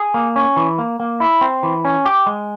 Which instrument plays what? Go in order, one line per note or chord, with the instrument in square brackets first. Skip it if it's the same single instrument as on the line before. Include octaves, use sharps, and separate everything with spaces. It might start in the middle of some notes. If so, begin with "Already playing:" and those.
Already playing: [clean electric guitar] G#4
A#3
C#4
E3
A#3
A#3
E4
C4
E3
C#4
G4
G#3